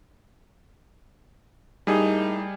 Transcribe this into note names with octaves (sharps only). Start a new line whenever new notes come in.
A2 G3 A#3 D#4 G#4